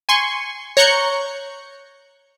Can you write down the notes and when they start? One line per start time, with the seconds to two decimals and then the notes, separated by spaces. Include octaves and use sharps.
0.09 G#5 C6 C#6
0.77 C#5 A#5 C#6 F#6 G6 C#7